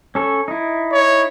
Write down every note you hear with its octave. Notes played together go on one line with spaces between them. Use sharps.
C#4 A4 C#5
D#4 E4
C#5